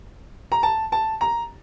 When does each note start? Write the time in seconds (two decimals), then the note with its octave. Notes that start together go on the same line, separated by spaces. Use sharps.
0.52 A#5
0.63 A5
0.92 A5
1.21 A#5